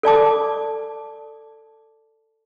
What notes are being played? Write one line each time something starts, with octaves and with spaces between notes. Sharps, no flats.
A4 D5 A5 D6